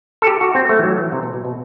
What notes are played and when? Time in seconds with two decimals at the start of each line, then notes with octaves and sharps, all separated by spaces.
0.22 A4
0.27 G4
0.41 F#4
0.55 C4
0.69 A3
0.79 E3
0.84 F#3
0.98 E3
1.12 C3
1.23 B2
1.33 B2
1.45 B2